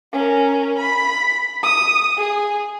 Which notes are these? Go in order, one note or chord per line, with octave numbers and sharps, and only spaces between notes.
C#4 A#4
B5
D#6
G#4